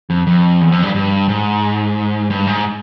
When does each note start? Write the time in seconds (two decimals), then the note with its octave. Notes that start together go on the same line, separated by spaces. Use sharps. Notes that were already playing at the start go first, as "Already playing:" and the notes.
0.10 F2
0.27 F2
0.61 E2
0.72 F2
0.83 G2
0.95 G2
1.28 G#2
2.30 G2
2.47 G#2